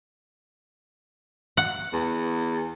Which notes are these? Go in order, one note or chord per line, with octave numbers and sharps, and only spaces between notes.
F#5
E2